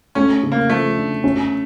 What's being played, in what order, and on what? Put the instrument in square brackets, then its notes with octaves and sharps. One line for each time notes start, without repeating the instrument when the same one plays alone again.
[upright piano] A3 [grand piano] C#4
[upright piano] C#3
[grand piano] A#3
[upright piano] F3 [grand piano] A3
[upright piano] D4
C#4